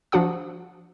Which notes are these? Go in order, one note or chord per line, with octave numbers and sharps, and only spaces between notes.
F3 D4 F#4 F#5 D#6